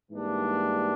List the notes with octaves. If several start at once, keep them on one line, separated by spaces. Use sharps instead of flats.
G#2 E3 G3 A#3 D4